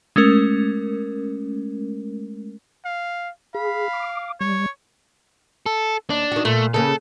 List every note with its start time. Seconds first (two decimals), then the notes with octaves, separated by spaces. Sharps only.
0.16 G#3 A3 C#4 A#4
2.85 F5
3.55 G#4 F5 B5
3.93 D6
4.41 G3 C#5
5.66 A4
6.10 D#2 D4
6.32 D#3 F#4
6.45 A#2 A3
6.74 C#3 A#3 C#4 A4